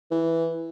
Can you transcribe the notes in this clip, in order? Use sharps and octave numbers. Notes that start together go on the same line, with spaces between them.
E3